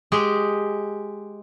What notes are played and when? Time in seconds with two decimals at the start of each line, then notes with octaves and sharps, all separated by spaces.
0.12 G#3 G4 G#4